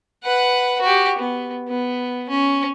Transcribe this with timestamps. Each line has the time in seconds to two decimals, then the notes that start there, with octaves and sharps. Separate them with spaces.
0.23 B4 F#5
0.81 F#4 G4
1.19 B3
1.68 B3
2.29 C#4